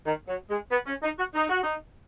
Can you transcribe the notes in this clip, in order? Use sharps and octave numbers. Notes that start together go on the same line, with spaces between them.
D#3
F#3
G#3
B3
C#4
D#4
F#4
D#4
F#4
D#4